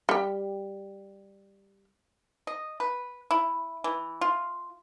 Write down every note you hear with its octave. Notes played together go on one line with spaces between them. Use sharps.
G3 G4
D#5
B4
E4
E3
F4